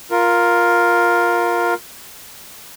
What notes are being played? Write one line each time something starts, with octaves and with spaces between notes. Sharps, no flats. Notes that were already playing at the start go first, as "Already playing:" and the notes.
F4 A#4